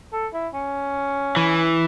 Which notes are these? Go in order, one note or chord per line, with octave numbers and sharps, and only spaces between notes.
A4
E4
C#4
E3